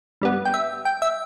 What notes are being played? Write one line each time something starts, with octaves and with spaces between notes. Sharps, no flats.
G2 G3 B3
G5
E5
G5
E5